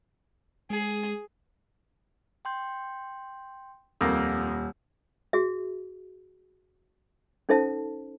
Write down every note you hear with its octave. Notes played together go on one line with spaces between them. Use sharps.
G#3 G#4
G5 C6 G6
D#1 F2 A#3 E6 F6 G6
F#4 G#4 E5
C#4 D#4 A4 C5 E5 A5